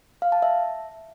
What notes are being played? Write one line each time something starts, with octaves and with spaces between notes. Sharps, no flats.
F5
A5
E5